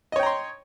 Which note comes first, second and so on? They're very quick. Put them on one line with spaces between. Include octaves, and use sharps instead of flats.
D#5 C#5 G5 A#5 C6